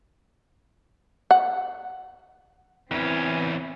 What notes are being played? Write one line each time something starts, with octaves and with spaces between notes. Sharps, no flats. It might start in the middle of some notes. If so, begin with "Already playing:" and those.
F#5
E2 E3 C4 C#4